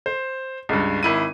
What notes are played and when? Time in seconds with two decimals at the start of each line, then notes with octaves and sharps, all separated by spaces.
0.06 C5
0.69 C#2 G2
1.03 G#1 E4 D#7